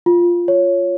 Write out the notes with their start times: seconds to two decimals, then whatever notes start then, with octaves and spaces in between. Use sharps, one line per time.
0.06 F4
0.48 C#5